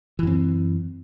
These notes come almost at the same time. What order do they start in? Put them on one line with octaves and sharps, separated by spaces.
E3 F#2 C4